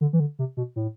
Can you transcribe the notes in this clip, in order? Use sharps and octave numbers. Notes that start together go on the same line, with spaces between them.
D3
E3
D3
C3
B2
A2